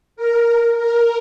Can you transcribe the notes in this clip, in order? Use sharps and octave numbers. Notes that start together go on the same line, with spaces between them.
A#4
A#4